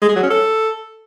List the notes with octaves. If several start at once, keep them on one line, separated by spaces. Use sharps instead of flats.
G#3
G#4
F#3
C#4
A4